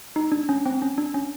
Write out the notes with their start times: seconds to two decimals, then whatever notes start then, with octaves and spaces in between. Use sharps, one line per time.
0.16 D#4
0.32 D4
0.49 C#4
0.66 C4
0.82 C#4
0.98 D4
1.14 C#4